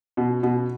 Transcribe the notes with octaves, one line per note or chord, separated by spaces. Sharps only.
B2
B2